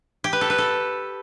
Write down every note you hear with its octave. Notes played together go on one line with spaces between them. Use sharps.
G4
B4
A4
B4
A4